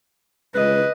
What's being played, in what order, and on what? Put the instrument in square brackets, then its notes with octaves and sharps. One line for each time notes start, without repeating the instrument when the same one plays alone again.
[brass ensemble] C#2 [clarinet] B4 [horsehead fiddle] D#5